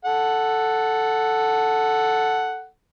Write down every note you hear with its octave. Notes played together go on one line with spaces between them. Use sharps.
A4 F#5